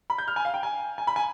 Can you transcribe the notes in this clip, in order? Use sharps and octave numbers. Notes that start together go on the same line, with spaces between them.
B5
G6
F6
G#5
F5
G5
G#5
G#5
B5
G#5